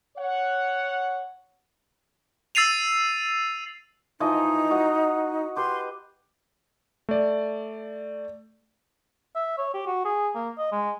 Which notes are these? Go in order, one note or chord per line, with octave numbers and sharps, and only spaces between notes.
C#5 F#5
E6 A6 C7 D#7 F7
E3 F3 D#4 D#5
F#4 D#5 F#5
G4 B4 C6
A3 D5
E5
C#5
G4
F#4
G#4
A#3
D#5
G#3